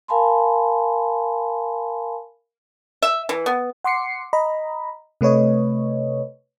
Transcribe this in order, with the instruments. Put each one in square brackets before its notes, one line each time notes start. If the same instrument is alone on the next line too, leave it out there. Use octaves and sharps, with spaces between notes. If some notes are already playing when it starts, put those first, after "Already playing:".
[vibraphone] A#4 F5 G#5 A5 B5 C6
[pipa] E5
E3
B3
[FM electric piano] F#5 C6 D6 C7 C#7
D#5 A#5 B5
C3 A3 B4 C#5 D#5